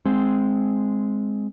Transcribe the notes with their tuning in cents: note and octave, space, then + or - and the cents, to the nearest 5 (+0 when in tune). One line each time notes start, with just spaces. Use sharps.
G#3 +0 C4 +0